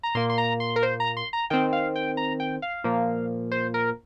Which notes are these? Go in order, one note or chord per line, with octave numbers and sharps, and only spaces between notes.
A#5
A#2 A#3 C6
C6
A#5
C6
A#4
C5
A#5
C6
A#5
D#3 C4 G5
F5
G5
A#5
G5
F5
A#2 F3 A#3
C5
A#4